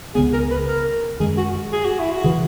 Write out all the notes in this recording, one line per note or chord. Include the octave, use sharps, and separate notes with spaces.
C#2 C#3 G#3 B3 G#4
A#4
B4
A#4
F#2 D#3 G#3 G#4
F#4
G#4
F#4
E4
F#4
C#3 E3